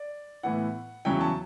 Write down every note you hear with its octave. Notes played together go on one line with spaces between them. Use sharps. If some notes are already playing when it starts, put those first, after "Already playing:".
Already playing: D5
A2 E3 B3 E4 F#5
E2 C#3 F#3 C#4 E4 G5
A5